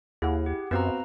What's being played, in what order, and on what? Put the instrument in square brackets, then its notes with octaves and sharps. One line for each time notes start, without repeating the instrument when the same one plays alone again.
[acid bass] D#2 [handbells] E4 [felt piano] G#4 F#5
[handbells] G4
[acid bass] F#2 [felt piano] B3 C4 F#4 [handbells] B4 F5 A#5